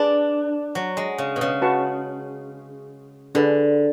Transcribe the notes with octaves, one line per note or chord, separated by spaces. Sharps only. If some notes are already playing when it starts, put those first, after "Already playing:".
Already playing: D4 G#4 B4 D5 A5
F#3
G#3
C#3
B2
C#3
F#4 B4 F#5 A5 C#6
D3 D4 G#4 B4